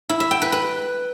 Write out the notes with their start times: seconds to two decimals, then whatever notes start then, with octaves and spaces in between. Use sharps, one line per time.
0.09 E4
0.20 E5
0.31 G5
0.42 B4
0.52 B4